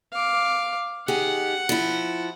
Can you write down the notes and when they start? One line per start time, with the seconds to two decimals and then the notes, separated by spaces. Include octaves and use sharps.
0.13 F5 D6
1.08 D#3 G4 G#4 F#5
1.69 F3 E4